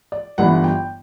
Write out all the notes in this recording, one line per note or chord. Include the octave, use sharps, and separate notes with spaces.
D5
G1 G2 E3 G3 F#5
G5